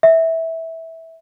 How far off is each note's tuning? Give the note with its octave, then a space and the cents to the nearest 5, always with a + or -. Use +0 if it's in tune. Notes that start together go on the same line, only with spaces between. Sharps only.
E5 -15